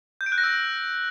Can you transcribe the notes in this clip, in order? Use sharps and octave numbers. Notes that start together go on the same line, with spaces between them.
G6
D7
F#6
A#6
E6